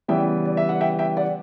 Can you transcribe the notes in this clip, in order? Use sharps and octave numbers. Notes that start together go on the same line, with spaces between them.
C#3 E3 G3 B3 E5 G5
D5
E5
F#5
E5 G5
E5 G5
D5 F#5